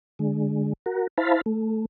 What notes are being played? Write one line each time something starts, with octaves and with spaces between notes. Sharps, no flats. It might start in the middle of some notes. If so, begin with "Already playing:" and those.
D3 G#3
F#4 A#4
E4 C5 F5 A5 B5
A3